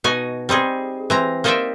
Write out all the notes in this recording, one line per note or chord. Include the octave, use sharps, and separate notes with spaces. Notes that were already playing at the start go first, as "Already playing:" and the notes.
B2 D#4 F#4 G#5
G3 C4 D#4 G#4
E3 C4 A#5
A#3 D#4 C5 D5 E5 G5